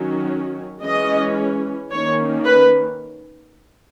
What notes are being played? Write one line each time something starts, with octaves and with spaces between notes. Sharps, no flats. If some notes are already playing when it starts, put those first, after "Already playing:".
Already playing: D#3 F#3 C#4
E3 G#3 C#4 D#5
D#3 A#3 C#4 C#5
B4